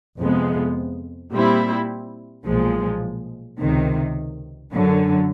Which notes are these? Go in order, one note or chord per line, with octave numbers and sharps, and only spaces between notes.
F2 C3 F3 G#3 B3
A#2 G3 C4 E4
B1 A#2 F3 G#3
C#2 C3 D#3
F#2 D3 F#3